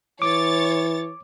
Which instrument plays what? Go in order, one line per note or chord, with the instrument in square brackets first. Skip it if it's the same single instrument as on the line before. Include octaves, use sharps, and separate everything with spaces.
[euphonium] E3 [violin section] C#5 A6 [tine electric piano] D6